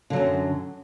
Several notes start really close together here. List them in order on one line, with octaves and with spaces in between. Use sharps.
D3 F#3 F#2